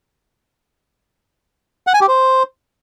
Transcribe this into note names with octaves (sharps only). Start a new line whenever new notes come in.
F#5
G#5
G4
C5